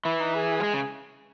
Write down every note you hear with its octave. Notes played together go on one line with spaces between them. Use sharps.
E3 E4
D#4
G#4
F#3
G#3
C#3